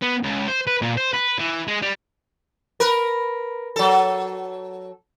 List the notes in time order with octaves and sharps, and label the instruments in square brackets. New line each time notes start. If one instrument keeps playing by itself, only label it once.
[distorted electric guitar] B3
C#2
C5
B4
A#2
C5
B4
E3
G#3
G3
[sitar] A#4 B4
F#3 A4